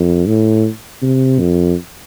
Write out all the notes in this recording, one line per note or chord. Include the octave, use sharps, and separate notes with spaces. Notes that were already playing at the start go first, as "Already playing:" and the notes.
Already playing: F2
A2
C3
F2